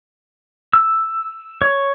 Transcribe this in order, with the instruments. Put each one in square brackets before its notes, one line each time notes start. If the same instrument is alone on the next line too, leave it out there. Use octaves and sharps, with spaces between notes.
[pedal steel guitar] E6
C#5